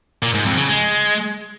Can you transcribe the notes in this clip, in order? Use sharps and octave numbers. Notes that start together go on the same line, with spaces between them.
A#2
G#2
F2
C#3
G#3